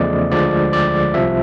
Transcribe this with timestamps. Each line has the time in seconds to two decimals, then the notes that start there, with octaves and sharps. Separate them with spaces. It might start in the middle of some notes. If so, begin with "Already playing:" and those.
Already playing: E2 C#3 F3 A3 D5 D#5
0.31 D2 D3 F3 G#3 D5
0.73 D5
1.14 C2 C3 F3 E5